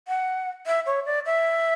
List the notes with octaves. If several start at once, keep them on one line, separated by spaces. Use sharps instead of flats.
F#5
E5
C#5
D5
E5